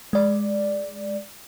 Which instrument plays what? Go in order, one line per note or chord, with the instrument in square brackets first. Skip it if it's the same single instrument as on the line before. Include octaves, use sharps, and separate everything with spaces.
[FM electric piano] G#3 D5